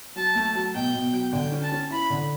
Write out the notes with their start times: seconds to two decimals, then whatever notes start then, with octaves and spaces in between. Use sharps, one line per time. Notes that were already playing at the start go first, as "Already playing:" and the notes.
0.16 F#3 A5
0.35 A3
0.55 F#3
0.75 B2 G5
0.94 B2
1.13 F#3
1.33 D3 G5
1.52 C#4
1.62 A5
1.72 C#4
1.90 E4 B5
2.10 D3